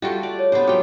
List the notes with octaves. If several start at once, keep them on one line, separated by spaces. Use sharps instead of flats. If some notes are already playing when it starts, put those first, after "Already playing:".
G3 A3 F4 F#4 A4 G5
D5
C#5
C3 B3 D4 C5
F#3 G3 F4 A4 G5 D6